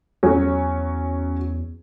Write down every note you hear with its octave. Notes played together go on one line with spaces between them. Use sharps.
E2 F#3 C#4